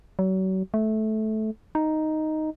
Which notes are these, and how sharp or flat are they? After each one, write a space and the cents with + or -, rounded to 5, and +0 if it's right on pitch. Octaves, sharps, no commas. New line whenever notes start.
F#3 +35
A3 -15
D#4 +0